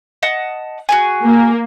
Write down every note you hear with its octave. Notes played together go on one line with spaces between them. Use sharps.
D#5 F#5 A5
F#4 G#4 G#5
A#3